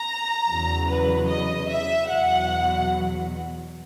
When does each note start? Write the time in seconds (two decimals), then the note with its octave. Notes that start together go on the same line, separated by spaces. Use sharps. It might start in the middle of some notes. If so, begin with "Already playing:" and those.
Already playing: A#5
0.46 E2 C#3 F#3
0.87 B4
1.28 D#5
1.67 E5
2.08 E2 B2 F#3 F#5